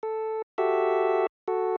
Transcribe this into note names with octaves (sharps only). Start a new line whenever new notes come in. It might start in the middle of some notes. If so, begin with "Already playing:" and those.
A4
F#4 G4 A4 E5
F#4 A4